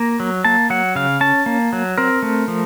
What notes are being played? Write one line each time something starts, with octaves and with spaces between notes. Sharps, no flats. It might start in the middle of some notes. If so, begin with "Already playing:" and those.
Already playing: A#3 A#5
F#3
A#3 A5
F#3 F#5
C#3 F5
C#4 A5
A#3
F#3
C4 A#4
A3
F3